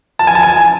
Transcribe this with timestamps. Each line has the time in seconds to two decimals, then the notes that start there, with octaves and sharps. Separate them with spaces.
0.19 A5
0.27 G#5
0.35 A5
0.43 G#5